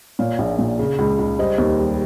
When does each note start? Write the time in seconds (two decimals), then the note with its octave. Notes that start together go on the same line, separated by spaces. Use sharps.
0.19 A#2 C#5 F5
0.39 A#1
0.59 A#2
0.79 C#3
0.99 C#2
1.19 C#2
1.39 G3 C5 D#5
1.58 D#2
1.79 G3